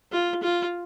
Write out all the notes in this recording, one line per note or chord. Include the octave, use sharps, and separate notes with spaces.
F4
F4